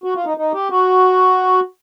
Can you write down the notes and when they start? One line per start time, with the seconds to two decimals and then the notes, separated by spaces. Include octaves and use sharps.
0.04 F#4
0.15 F4
0.25 D#4
0.37 D#4
0.53 G4
0.70 F#4